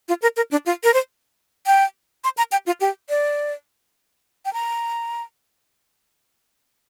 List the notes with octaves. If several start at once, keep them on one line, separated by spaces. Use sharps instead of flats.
F4
A#4
A#4
D4
F4
A#4
C5
G5
C6
A#5
G5
F4
G4
D5
G5
A#5